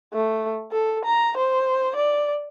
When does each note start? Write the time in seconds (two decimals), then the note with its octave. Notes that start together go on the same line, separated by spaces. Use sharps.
0.14 A3
0.72 A4
1.05 A#5
1.37 C5
1.96 D5